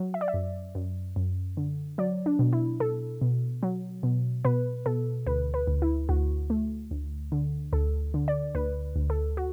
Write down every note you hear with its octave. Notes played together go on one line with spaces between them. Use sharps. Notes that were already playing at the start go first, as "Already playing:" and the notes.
Already playing: F#3
E5
D5
E5
F#2
F#2
F#2
D3
F#3 D5
D4
B2
E4
B2 A4
B2
F#3
B2
B2 B4
B2 A4
D2 B4
B4
D2
E4
D2 F#4
A3
D2
D3
D2 A4
D3
D5
D2 B4
D2
A4
F#4